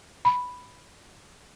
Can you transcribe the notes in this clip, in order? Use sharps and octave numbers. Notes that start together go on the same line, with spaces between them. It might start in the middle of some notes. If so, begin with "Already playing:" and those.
B5